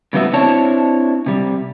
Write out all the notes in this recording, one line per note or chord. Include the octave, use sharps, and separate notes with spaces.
A2 C#3 G3 B3 F#4 E5
C4 D4 E4 C#5 A5
C3 G3